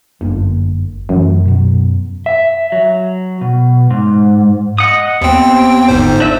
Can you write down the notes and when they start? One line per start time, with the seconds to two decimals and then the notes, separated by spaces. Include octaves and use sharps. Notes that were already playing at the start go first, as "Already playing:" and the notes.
0.21 G1 F#2 D3 A#3
1.09 F#2 E3 F#3 A3
1.45 B2 F#3
2.26 E5
2.72 F#3
3.41 B2
3.90 G#2
4.78 D#5 F#5 D#6
5.21 D#2 B3 C4 G5
5.88 G1 G#2 C5
6.20 D4 E5 E6